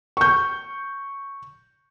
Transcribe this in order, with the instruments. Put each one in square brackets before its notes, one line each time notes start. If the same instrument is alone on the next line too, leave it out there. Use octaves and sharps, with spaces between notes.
[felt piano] C#6 G6